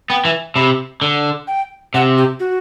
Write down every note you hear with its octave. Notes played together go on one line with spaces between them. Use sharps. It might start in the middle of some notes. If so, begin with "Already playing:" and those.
B3 G5
E3
C3 B5
D3
G5
C3 F#5
G4
F#4